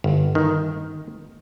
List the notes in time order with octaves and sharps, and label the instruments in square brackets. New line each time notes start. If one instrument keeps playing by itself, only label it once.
[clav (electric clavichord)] G1
D#3